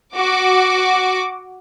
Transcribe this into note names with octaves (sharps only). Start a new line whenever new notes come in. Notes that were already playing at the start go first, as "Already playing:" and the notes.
F#4 D6